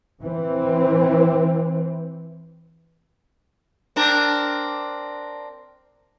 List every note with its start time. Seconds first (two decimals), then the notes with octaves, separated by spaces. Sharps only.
0.22 E3 C4
3.96 C4 D4 A#4